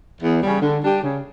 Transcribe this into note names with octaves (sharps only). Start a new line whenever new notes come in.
E2
C#3 G3
D3
G3 D4 G4
C#3